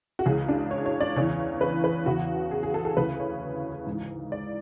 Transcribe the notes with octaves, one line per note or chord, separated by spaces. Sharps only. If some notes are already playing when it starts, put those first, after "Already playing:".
F#4
C#2 C#3 E3 G#4
D4
C#5
C#5
D5
E2 C#3 E3 C#5
B4
B4
E2 C#3 E3 F#4
G#4
G#4
A4
A4
D2 C#3 E3 B4
C#5
G#2 E3
D5